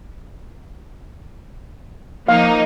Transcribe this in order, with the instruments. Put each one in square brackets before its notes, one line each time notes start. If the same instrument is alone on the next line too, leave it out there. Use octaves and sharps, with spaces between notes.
[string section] F3 A#3 D#4 [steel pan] F5